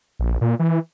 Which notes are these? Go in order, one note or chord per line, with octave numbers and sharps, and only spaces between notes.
A#1
A#2
E3